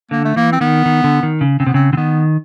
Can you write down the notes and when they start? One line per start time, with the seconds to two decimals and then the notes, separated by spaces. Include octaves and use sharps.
0.11 D3 A#3
0.25 A3
0.36 E3 A#3
0.52 C4
0.61 D#3 B3
0.85 D#3
1.04 D3
1.23 D#3
1.41 C#3
1.60 C#3 C4
1.66 C3 B3
1.74 C#3 C4
1.92 D3 C4
1.97 D#3 B3